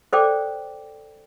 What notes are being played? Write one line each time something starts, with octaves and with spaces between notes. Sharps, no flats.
A4 C5 D5 G5 D6